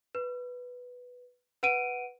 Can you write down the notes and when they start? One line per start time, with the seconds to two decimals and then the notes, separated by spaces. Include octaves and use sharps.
0.15 B4
1.63 B4 F#5 D7 D#7